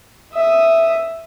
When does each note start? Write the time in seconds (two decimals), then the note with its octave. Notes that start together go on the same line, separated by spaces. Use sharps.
0.33 E5 D#6